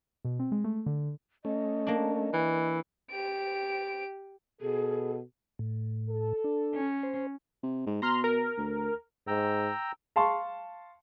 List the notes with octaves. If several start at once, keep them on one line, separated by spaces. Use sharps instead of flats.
B2
C4
G#3
A3
D3
A3 C#4 D#5
A#3 D4
E3
G4 D7
B2 G#4 A4
A2
A4
D4
C#4
C5
C3
G#2
B2 A#5 C6 F6
A#4
D2
G#2 G5 A#5 E6
F5 A5 C6 C#6